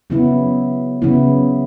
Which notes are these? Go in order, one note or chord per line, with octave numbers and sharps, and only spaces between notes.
C#3 F#3 B3 E4
C#3 F#3 B3 E4